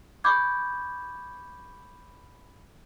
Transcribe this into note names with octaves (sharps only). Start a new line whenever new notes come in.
B5 C#6 D6 G6 G#6